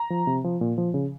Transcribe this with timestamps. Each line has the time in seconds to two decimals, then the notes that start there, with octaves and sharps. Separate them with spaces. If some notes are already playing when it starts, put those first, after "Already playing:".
Already playing: A#5
0.10 F3
0.27 C3
0.44 F3
0.61 A#2
0.78 F3
0.94 C#3